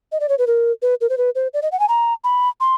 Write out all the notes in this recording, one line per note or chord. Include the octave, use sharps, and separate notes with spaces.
D#5
D5
C#5
B4
A#4
B4
A#4
C5
B4
C5
D5
D#5
F#5
G#5
A#5
B5
C6